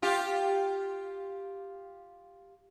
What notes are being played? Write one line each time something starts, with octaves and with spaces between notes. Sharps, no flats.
F4 G4